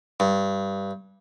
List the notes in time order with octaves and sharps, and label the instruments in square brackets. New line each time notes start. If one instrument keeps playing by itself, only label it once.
[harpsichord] G2